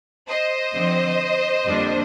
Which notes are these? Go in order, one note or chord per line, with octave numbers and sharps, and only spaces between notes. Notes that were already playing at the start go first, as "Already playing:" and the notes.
C5 D#5
D3 F3 C4
F2 D3 G3 A#3 D4